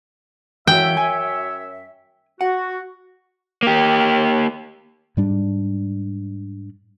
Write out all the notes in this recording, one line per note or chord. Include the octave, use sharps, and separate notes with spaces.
F#2 E3 F#4 C#5 E5 G5
G#5
F#4 F#5
A#3 G4
G#2 G3 D4